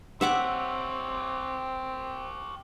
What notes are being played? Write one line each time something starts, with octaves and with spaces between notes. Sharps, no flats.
C4 G4 C#5 E5 F#5 D6